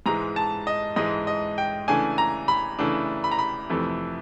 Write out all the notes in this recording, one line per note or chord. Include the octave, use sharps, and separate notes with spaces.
G#2 E3 G#3 A#5
A5
D#5
G#2 E3 G#3 D#5
D#5
G5
C#3 E3 A3 D4 G#5
A#5
B5
C#3 E3 A3 D4
B5
A#5
B5
F2 C3 E3 A3